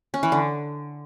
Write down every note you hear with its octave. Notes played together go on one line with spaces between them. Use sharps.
C#4
E3
D3